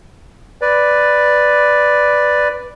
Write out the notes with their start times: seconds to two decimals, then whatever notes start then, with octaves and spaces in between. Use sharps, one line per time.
0.61 B4 D5